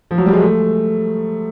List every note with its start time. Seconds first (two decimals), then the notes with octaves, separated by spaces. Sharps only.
0.11 F3
0.18 F#3
0.26 G3
0.32 G#3
0.40 A3